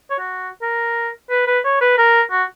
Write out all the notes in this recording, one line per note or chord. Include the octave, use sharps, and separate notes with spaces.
C#5
F#4
A#4
B4
B4
C#5
B4
A#4
F#4